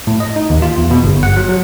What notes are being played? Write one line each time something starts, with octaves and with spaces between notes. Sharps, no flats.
A2
D#5
D#4
D#2
F4
E2
B2
G1
F#5
F#3
F#3